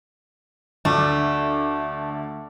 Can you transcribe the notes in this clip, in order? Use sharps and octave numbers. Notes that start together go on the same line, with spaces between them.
D2 A3 D4